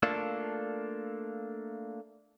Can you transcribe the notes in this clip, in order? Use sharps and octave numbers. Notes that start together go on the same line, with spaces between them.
A3 A#3 D4 F4 A4